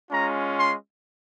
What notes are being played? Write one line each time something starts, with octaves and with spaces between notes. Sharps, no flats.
G#3 C#4 F4 A#5
C6